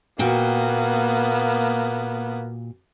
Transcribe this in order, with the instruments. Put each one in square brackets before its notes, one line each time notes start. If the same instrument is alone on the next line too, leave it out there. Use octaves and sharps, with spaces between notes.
[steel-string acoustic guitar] A#2 F#4 G5 [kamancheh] A#3 B3